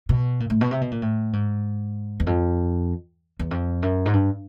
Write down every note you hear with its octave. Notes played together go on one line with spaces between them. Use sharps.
B2
A#2
A2
B2
C3
B2
A#2
A2
G#2
E2
F2
E2
F2
F#2
G#2
G2